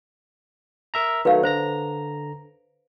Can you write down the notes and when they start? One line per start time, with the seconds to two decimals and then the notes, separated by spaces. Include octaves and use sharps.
0.94 A#4 E5 A#5
1.25 D#3 F#3 A3 B4 F5
1.43 D3 C5 A#5 A#6